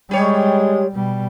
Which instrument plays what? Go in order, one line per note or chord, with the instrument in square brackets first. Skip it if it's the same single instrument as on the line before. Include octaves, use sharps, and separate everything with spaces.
[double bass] G3 [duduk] G#3 [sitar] G4 C#5
[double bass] B2 G3